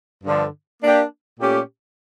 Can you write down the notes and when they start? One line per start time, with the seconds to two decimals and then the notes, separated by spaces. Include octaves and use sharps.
0.23 G2 D3 F3
0.81 A#3 D4 G4
1.39 A#2 A3 C#4 G4